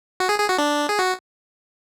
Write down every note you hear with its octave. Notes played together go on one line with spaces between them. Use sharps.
F#4
G#4
G#4
F#4
D4
G#4
F#4